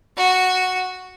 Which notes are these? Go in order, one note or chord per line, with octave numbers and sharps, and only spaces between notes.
F#4